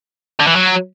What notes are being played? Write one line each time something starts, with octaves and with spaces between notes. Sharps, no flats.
D3
E3
F#3